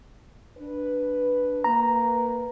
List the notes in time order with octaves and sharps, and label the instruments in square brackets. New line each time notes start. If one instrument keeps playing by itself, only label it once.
[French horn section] D4 B4
[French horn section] A#3 B4 [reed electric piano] A#5